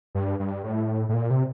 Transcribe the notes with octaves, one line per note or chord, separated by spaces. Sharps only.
G2
G2
A2
A2
A#2
C3